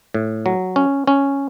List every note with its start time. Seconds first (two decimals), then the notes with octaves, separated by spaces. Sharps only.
0.14 A2
0.46 F#3
0.76 C#4
1.07 C#4